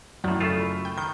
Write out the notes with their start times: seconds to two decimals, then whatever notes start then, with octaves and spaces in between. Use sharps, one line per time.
0.24 F#2 A2 D#3 F#3 E4 D5
0.40 C#3 A3 F4 A4 E7
0.60 B5
0.72 B5
0.85 G5
0.98 D#3 G6